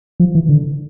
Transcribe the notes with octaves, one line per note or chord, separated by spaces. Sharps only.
F3
E3
D3